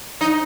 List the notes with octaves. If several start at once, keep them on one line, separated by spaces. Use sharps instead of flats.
D#4